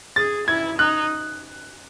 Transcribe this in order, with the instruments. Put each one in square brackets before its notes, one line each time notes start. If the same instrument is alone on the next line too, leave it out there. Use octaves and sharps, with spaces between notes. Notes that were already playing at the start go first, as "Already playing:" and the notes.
[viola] G#4 [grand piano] A6
[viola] E4 [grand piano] G#6
[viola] D#4 [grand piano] F#6